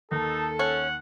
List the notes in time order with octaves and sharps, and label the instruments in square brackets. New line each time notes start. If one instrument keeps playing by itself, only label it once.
[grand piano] D#2 [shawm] D#4 [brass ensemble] A4
[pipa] C#4 [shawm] F#5